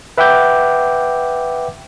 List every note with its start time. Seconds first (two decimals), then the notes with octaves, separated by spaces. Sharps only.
0.18 B4 E5 F#5 G5 D6 G6